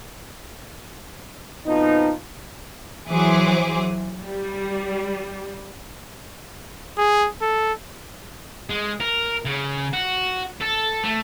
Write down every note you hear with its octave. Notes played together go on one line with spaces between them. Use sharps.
F2 B2 F3 B3 D#4
E3 F#3 G#4 C5 D6
G3
G#4
A4
G#3
A#4
C#3
F#4
A4
A3